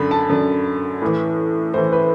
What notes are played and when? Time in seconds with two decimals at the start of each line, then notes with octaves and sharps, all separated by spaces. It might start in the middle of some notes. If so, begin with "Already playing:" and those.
Already playing: F#2 D3 B5
0.11 A5
0.29 F#2 D3
1.02 A2 E3
1.74 A2 E3 C5
1.92 B4